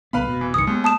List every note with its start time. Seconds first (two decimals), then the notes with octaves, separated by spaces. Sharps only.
0.13 C2 D3 B3 B4 F5 B5
0.27 F1 B2
0.41 E3
0.54 G1 C2 D#3 D#6 C#7
0.67 D#2 G#3 B3
0.84 A5 D#6 E7